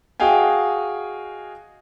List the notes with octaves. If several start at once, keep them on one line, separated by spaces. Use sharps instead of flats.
F#4 G#4 D#5 F5 G5 G#5